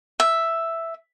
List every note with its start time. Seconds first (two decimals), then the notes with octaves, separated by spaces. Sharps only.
0.20 E5